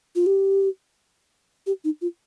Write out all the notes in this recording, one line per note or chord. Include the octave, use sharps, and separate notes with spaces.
F4
G4
G4
D#4
F4